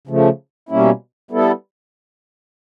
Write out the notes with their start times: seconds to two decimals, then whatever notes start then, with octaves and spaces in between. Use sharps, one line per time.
0.07 C#3 F3 A3
0.69 B2 G3 A#3 C#4 E4
1.31 G3 B3 E4 A4